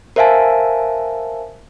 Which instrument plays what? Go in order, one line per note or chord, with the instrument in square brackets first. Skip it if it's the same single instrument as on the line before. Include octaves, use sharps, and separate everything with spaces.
[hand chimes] A#4 C5 E5 F5 G#5 A5